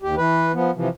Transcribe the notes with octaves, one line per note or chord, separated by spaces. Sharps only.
D#2 G4
E3 B4
F3 B3
C3 E3 F3